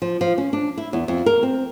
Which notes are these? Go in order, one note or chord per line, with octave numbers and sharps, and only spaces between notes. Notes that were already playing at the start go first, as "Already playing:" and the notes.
F3
F3
C#4
D4
E4
E2
F2
A#4
C4